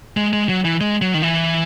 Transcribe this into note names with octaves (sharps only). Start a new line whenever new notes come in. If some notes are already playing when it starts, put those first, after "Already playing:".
G#3
G#3
F#3
E3
G#3
F#3
D#3
E3